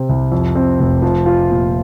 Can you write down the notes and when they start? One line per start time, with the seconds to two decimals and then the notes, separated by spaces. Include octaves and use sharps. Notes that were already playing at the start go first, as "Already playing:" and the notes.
Already playing: C3 C4
0.09 C2
0.32 F2
0.55 C4
0.80 F1
1.02 F3
1.26 F4
1.50 A#2